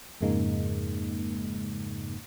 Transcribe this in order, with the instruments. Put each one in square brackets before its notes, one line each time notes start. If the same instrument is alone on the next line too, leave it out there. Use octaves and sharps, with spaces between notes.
[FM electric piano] F2 G#2 C#3 G#3 A#3 D#4